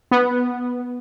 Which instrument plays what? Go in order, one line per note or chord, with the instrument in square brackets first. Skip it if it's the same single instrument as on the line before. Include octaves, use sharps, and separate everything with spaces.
[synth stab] B3